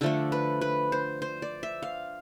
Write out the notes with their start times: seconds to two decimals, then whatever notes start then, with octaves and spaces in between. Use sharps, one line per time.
0.01 D3 F3 A3 D4 A4
0.32 B4
0.61 B4
0.92 C5
1.22 C5
1.42 D5
1.63 E5
1.82 F5